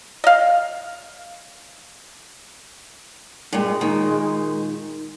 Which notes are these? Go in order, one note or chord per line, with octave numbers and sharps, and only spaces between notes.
D#5 F5
G2 A#2 G#3
A#2 D#3